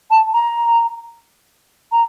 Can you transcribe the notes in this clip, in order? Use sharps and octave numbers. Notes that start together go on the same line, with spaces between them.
A5
A#5
A#5